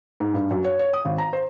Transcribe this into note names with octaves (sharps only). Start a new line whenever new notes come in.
G#2
G2
F#2
C#5
C#5
D#6
G#1
A#5
C5